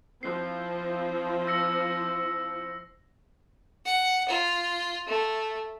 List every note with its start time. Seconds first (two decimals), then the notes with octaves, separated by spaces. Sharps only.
0.23 F3 C4 E4 C7
1.47 E6 A#6 C#7
3.85 F#5
4.29 F4
5.07 A3